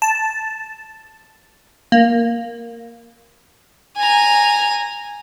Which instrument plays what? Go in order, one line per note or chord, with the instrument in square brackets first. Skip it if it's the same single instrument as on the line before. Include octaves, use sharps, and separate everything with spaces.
[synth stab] A5
A#3
[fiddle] G#5 A#5